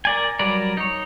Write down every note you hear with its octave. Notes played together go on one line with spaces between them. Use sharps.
A#4 D5 G#5
F#3 G3 A#4 B4 D5
D#4 C#5